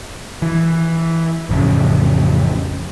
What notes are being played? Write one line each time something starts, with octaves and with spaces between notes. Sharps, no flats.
E3
A1 F2 C#3